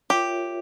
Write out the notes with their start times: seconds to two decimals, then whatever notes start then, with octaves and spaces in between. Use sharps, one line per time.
0.10 F4 G4 A#4 C#5 E5